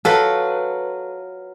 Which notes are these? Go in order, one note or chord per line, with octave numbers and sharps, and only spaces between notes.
F#3 F4 A4 B4